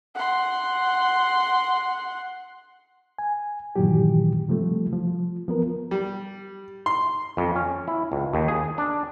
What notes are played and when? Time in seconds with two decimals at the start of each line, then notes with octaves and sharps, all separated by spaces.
0.15 F#5 C6
3.19 G#5
3.76 G2 A#2 D#3 E3 F#3 G4
4.48 C3 F3 G3 A3
4.93 F3
5.48 F3 B3 A#4
5.91 G3
6.86 C6
7.37 F2
7.56 C#4
7.88 E4
8.12 C#2
8.33 D#2
8.48 G#4
8.78 D4